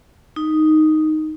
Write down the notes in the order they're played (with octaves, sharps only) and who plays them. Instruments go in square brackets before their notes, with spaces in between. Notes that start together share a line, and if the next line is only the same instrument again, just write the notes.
[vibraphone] D#4